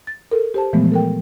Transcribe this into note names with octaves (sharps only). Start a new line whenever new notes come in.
A6
A4 A#4
G4 C5 A5
A#2 E3 F3 G#3 A3 B3
A4 A#4 G5